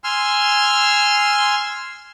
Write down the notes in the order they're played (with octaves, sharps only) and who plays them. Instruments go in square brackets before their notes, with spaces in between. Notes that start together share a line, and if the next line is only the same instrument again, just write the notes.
[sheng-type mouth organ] G#5 C6 E6 F6